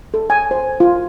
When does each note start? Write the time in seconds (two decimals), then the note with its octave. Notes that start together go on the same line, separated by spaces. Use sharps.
0.14 A4
0.30 G#5
0.51 C5
0.80 F4